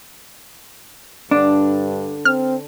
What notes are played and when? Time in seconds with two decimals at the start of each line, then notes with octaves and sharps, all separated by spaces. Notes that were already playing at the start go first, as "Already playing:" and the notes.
1.31 G2 D3 D4
2.25 C4 F6